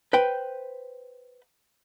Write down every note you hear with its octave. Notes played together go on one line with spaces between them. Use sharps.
B4 C5 G5